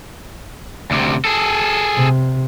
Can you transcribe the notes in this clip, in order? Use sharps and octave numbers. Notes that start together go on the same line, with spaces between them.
D2 C3
G#4 A4
C3